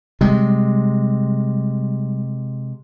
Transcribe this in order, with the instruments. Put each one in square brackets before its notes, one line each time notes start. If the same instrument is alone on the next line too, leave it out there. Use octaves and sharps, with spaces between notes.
[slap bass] C3 G#3 [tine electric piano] G3